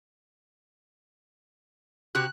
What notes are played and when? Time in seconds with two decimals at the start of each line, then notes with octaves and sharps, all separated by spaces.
2.15 C3 F#4 G4 F#6